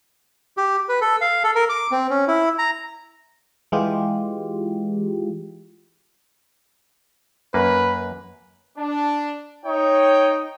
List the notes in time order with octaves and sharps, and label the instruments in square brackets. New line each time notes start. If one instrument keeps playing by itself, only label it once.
[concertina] G4
B4
A4
F5
A4
A#4
D6
C4
C#4
E4
A#5
[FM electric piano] E3 G#3 F4 G4
[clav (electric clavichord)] F#2 A#3 [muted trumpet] B4
[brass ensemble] D4
[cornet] D#4 [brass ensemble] C#5 G5